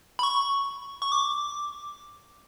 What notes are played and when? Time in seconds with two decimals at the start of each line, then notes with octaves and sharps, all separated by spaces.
0.19 B5
0.23 C#6
1.02 C#6
1.12 D6